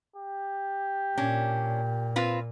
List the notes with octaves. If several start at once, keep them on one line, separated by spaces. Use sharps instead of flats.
G4
A#2 C#4 D4
C4 F4 B4